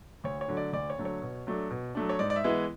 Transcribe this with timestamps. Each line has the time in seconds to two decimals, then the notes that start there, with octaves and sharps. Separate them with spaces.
0.24 D2 C#5
0.41 C#5
0.48 D3 F#3 A3
0.57 D5
0.73 D2 D5
0.90 C#5
0.98 D3 F#3 A3
1.05 C#5
1.22 B2
1.47 F#3 A3 D4
1.70 B2
1.95 F#3 A3 D4
2.09 C#5
2.19 G#2 D5
2.30 D5
2.36 E5
2.44 E3 G#3 B3 E4